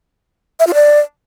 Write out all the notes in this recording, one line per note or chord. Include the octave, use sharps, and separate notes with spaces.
E5
F4
D5